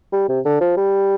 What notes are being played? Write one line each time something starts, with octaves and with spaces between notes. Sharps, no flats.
G3
C3
D3
F3
G3